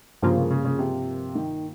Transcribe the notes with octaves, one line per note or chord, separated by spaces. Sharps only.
G2 C#3 F3 A#3 F4
C#3
C#3
C#3
C3
D#3